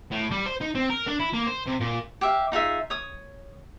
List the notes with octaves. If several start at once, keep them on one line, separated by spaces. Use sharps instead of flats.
A2
G3
C5
D#4
C4
A#4
D4
E4
A#3
C5
C3
A#2
G4 E5 F5
D#4 F4 G#4 E5
C#5 D#6